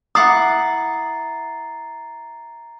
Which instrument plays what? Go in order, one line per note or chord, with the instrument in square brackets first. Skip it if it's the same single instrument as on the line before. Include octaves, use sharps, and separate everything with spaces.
[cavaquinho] E4 F#5 D6 [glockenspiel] A#5 A6 C7 [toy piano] D#6